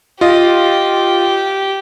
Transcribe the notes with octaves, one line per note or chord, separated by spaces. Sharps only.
F4 G4 D#5